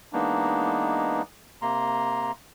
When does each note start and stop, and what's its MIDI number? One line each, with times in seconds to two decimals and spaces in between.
0.13 1.22 52
0.13 1.22 56
0.13 1.22 58
0.13 1.22 59
0.13 1.22 62
0.13 1.22 63
1.62 2.32 48
1.62 2.32 58
1.62 2.32 82
1.62 2.32 84